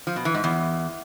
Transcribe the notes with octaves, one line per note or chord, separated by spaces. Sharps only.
F3
B2
E3
G#2
E2